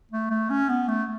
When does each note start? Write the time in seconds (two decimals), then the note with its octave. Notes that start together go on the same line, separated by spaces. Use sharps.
0.11 A3
0.30 A3
0.50 C#4
0.69 B3
0.88 A3